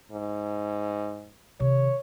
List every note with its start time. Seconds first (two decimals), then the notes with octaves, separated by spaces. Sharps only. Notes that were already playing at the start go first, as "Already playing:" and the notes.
0.11 G#2
1.60 C3 D#3 C#5